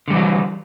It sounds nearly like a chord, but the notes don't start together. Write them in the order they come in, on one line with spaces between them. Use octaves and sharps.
D3 G3 E3 F#3